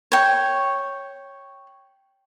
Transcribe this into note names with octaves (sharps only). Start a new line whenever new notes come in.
C#5 G5